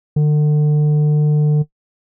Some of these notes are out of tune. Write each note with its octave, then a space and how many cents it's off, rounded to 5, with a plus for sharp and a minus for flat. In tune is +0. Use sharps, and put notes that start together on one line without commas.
D3 +35